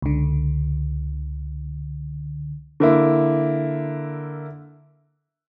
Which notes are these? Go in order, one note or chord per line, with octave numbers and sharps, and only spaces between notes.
C#2 D3
D3 A#3 E4